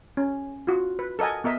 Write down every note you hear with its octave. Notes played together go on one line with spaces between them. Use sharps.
C#4
F4 F#4
B4
A4 A#4 D#5 F#5 G#5
B3 A#4 D#5 E5